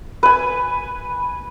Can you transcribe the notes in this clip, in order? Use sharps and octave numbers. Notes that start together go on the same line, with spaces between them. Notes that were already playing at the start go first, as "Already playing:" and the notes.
B4 G#5